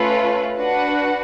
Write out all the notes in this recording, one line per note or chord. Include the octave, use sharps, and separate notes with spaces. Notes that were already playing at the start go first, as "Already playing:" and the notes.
Already playing: A3 C#4 F4 B4
D4 F#4 B4 F#5